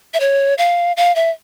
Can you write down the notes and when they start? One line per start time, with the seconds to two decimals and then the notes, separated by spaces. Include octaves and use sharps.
0.14 E5
0.20 C#5
0.58 F5
0.97 F5
1.16 E5